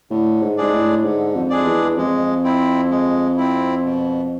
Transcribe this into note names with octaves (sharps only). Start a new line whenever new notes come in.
A2 D3
G#2
G#2 G#3 D4 G#4 D5
A2
G#2 D3
F2
G#3 D4 G#4 D5
E2
F2 G#3
C4 E4
G#3
C4 E4
B2